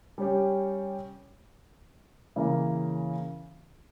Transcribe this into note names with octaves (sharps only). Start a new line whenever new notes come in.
G3 C#4 G4
C#3 E3 A#3